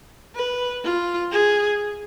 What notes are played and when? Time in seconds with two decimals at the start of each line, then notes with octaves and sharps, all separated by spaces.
0.36 B4
0.84 F4
1.32 G#4